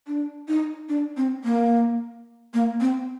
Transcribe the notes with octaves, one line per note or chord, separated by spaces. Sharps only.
D4
D#4
D4
C4
A#3
A#3
C4